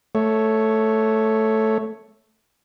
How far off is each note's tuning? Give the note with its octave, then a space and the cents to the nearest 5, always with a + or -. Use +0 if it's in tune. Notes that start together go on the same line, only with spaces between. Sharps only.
A3 +0 C#5 +0